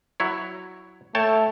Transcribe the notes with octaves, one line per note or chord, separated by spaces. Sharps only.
F#3 E4 C#5
A3 C#5 G5 A5